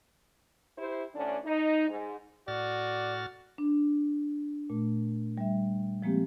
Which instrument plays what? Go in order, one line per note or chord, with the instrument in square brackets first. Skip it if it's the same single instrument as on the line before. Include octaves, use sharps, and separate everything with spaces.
[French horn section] E4 G4 C5
D2 A2 D3 C#4 D4
D#4
G#2
[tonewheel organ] A2 F6 A6 [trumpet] F#4 [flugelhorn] D5
[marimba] D4
A#2 A3
G3 E5
F3 G#3 A#3 C4 G4